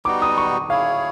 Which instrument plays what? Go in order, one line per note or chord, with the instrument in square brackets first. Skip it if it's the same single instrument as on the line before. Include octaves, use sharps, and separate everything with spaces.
[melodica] G3 B3 D#4 F#4 [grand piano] D6
[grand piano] D#6
C#6
[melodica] E4 G#4 C#5 [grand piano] F5